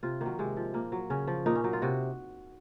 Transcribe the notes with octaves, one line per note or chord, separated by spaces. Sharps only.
C3 F4
D#3 F#3 A#3
C3 G#3
F3
A#2 A#3
F#3
C#3 C#4
F3
A#2 D#4
C#4
F#3 D#4
F4
C3 F#4